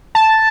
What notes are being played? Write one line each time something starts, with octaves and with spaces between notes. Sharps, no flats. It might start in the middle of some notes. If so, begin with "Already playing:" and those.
A5